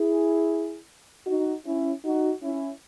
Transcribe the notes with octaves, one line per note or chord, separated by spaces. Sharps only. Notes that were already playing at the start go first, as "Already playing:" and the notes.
Already playing: E4 G#4
D#4 F#4
C#4 E4
D#4 F#4
C#4 E4